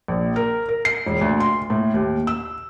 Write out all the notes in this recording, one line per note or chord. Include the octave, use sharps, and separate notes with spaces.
A#1
A#4
A#4
C7
E1
D2
C6
A2
D#2
E6